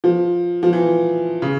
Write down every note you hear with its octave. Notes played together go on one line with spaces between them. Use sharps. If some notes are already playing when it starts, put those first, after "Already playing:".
F3
F3
E3
C#3